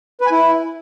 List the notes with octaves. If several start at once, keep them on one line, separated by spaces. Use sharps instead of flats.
B4
G#5
E4